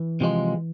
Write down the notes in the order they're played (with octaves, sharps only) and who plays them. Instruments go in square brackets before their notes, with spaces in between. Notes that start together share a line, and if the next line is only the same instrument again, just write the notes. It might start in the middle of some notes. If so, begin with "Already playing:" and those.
Already playing: [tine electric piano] E3
[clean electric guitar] C3 F3 G#3